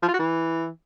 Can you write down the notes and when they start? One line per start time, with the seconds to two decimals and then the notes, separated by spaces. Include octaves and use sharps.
0.03 F3
0.08 F4
0.14 F#4
0.20 E3